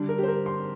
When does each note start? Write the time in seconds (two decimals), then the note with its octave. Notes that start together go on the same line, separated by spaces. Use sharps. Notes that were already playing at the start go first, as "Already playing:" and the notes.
Already playing: D3 G3 D4
0.09 A#4
0.18 G4
0.23 C5
0.28 A#4
0.46 C6